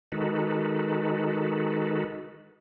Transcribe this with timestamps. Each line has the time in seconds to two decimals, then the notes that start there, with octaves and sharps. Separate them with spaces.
0.12 D#3 G#3 D#4 F#4 A4 B4